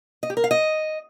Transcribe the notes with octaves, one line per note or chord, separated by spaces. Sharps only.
D#5
G4
A#4
F5
D#5